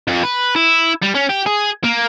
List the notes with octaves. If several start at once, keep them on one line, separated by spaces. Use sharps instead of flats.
F2
B4
E4
G3
C#4
G4
G#4
A#3